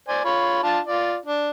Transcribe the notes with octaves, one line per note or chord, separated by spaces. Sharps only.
C5 D5 G#5
F4 C#5 B5
D4 F4 A5
F4 D5
D4